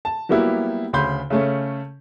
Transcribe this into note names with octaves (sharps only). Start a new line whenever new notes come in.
A5
F#3 G3 A#3 B3 E4 G4
D2 C#3 B5 C6 G6
C#3 A3 C#4